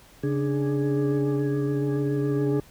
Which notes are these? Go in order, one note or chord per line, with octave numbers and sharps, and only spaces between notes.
C#3 D4 G#4